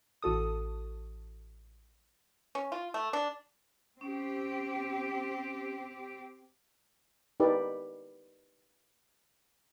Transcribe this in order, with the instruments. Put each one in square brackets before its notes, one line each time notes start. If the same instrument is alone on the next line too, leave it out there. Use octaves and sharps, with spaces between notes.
[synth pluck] A1 F#4 A4 D#6
[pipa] C#4
F4
A3
D4
[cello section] C4 G4 [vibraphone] C#4
[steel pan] D#4 G4 B4 D5